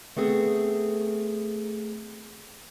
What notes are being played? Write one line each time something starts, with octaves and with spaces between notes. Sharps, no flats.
A3 B3 C4 G#4 A4